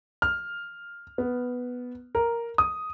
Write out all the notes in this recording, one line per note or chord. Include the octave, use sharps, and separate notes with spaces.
F6
B3
A#4
D#6